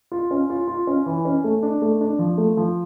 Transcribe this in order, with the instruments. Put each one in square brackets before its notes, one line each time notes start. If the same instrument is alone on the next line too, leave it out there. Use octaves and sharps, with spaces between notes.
[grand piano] F4
C#4
F4
F4
C#4
E3
C#4
A3
D4
A3
D4
F3
A3
F3